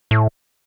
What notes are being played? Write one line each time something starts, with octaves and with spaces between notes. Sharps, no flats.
A2